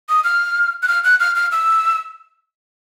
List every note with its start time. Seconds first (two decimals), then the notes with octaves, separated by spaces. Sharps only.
0.09 D#6
0.24 F6
0.83 F#6
0.88 F6
1.04 F#6
1.20 F6
1.36 F6
1.52 E6